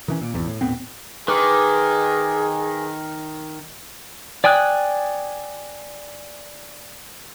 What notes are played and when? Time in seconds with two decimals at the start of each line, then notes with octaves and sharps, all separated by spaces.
0.08 D#3 E3 C#4
0.21 A#2
0.34 G#1 E2
0.47 A2
0.61 D#1 A2 B3 C4
1.28 D#3 G#4 B4 D6
4.44 D5 G5 G#5 D#6 F#6